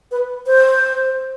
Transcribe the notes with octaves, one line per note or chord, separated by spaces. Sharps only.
B4
C5